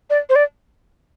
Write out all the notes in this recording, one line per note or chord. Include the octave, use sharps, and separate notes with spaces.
D5
C5
D5